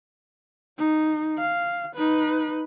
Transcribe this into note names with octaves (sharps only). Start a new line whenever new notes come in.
D#4
F5
D#4 B4